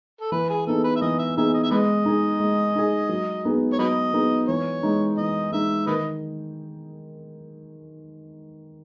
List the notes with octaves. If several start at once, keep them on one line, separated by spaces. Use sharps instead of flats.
A4
E3 B4
G#4
B3 D#4 G#4 A4
B4
E5
E3 D#5
E5
B3 D#4 G#4 E5
D#5
E5
G#3 B4 D#5
D#4 G#4
G#3
D#4 G#4
F#3
B3 D#4 G#4
C#5
F#3 B4 D#5
B3 D#4 G#4
E3 C#5
G#3 D#4
E3 D#5
G#3 D#4 E5
D#3 B4 D#5